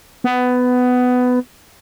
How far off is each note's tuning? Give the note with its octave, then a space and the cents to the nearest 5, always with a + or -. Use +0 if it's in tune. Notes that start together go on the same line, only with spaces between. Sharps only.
B3 +15